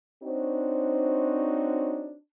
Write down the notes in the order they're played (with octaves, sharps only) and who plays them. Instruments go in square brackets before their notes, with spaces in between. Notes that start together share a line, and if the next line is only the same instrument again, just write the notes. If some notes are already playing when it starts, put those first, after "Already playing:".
[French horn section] C4 D4 D#4 F#4 C5 C#5